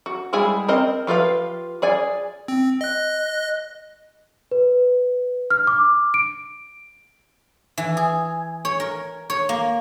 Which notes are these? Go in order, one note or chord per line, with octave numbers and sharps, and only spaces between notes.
F#4
G3 G#3 E4 G#4 G#5
C4 A#4 D#5
F3 F4 G4 B4 F5
G#4 D5 G#5
C4
D#5 F#6
B4
F6
D6
D7
E3
G#4
C#5
A#4
C#5
A#3